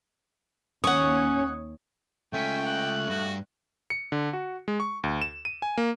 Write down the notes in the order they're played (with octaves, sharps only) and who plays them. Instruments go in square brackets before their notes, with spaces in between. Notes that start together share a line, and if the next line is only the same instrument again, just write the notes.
[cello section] D#2 C#5 [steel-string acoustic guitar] C#4 [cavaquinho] F#5 C#6 [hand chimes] D#6
[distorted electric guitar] C#2 C#4 [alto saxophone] A3 [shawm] G5 [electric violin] G#5 B6
[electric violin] F#6
[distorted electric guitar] G2 [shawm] F#4
[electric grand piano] C#7
D3
F#4
G#3
C#6
D2
E7
D#7
G#5
A#3